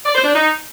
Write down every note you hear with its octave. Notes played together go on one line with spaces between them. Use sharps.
D5
C5
D4
D#4